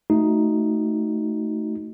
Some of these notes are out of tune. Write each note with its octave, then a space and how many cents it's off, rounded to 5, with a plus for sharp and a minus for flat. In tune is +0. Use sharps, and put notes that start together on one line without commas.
A3 +0 D#4 +0 F#4 +0